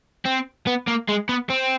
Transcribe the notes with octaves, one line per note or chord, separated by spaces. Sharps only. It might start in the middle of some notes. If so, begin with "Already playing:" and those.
C4
B3
A#3
G#3
B3
C4